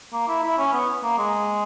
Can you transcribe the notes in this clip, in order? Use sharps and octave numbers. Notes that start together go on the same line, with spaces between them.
A#3
E4
E4
C#4
B3
A#3
G#3